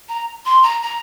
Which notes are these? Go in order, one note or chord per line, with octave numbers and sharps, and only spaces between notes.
A#5
C6
A#5
A#5